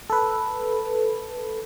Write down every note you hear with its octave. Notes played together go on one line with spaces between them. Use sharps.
A4 B4